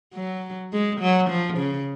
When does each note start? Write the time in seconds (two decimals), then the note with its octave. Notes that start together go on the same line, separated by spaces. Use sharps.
0.14 F#3
0.72 G#3
1.00 F#3
1.29 F3
1.58 C#3